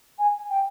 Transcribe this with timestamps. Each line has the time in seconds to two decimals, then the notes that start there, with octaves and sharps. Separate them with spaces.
0.19 G#5
0.50 G5